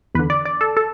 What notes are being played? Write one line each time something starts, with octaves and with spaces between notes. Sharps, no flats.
E2 D3 B4
D5
D5
A4
A4